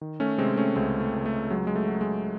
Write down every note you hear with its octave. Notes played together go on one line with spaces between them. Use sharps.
D#3
A3 C#4
C3 G#3 C4
A3 C#4
C#2 G#3 C4
A3
C#2
A3
F#3 G#3
G#3
A3
F#3
G#3